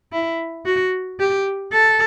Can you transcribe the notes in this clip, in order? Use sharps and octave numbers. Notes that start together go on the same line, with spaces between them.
E4
F#4
G4
A4